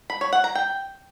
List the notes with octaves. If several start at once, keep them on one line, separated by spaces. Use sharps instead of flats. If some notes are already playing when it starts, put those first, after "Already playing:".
B5
C#5
F#5
A#5
G5